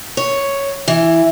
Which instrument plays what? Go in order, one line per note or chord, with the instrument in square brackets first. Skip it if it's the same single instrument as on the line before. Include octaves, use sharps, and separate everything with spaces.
[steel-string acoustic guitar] C#5
E3